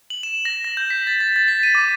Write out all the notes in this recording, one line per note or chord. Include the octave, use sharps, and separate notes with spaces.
F#7
E7
A#6
A#6
G6
B6
A6
A6
A6
B6
D#7
D6